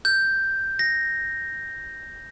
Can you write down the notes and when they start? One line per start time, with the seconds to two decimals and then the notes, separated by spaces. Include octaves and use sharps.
0.05 G6
0.79 A#6